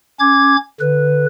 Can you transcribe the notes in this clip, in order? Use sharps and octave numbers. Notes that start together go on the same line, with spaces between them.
C#4 D6 G#6
D3 B4